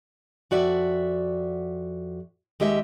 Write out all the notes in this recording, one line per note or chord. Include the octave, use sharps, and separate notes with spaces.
F2 F#4 D5 E5
D#2 G#3 G4 D#5 E5